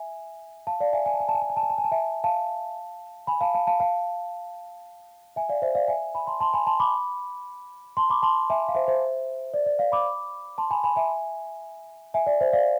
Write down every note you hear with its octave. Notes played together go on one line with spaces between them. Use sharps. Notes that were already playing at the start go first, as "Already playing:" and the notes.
Already playing: E5 G#5
F5 A5
D5 F5
E5 G#5
G#5
A5
G#5
A5
G#5
A5
G#5
A5
G#5
A5
G#5
A5
E5 G#5
F5 A5
G#5 B5
F5 A5
F5 A5
F5 A5
F5 A5
E5 G#5
D5 F5
C5 E5
D5 F5
E5 G#5
G#5 B5
A5 C6
A5 C6
G#5 B5
A5 C6
B5 D6
A5 C6
B5 D6
A5 C6
E5 G#5
F5
C5 E5
C5 E5
D5
D5
D5 F5
B5 D6
A5 C6
G#5 B5
G#5 B5
E5 G#5
E5 G#5
D5
C5 E5
D5 F5